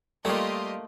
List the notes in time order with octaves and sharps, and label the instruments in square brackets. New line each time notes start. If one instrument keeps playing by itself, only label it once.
[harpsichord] G3 C#5 [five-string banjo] A3 A#3 [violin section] F4 G4 D#5